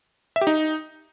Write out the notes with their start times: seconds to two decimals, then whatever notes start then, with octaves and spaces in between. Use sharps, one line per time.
0.36 E5
0.41 G4
0.47 D#4